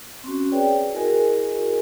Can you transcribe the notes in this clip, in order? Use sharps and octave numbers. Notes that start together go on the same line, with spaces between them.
C4 C#4 F#4
G#4 B4 C#5 D5 G5
E4 F#4 G#4 A#4 D#5 G#5